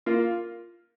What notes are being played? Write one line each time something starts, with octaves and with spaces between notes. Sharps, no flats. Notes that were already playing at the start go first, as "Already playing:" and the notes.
A#3 F4